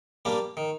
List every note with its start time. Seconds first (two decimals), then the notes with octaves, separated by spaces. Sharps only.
0.25 G3 A#3 D4
0.57 D#3